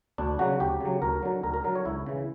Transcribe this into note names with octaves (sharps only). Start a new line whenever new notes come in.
D2 D4
C#3 F#3 F#4
D2 G4
C#3 F#3
D2 A#4
D3 F#3
D2 A#4
A#4
D3 F#3 A#4
C#5
C#2 E4
C#3 E3